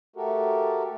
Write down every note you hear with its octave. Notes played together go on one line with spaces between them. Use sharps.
A3 F#4 G4 A4 A#4